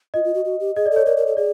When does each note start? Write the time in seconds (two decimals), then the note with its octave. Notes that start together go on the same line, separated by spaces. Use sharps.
0.14 F4 D#5
0.24 F4
0.34 F#4
0.45 F#4
0.60 G4
0.76 G#4 D#5
0.86 D5
0.91 A4
0.96 C#5
1.06 A#4 D5
1.17 A#4
1.27 A4
1.37 G#4 D5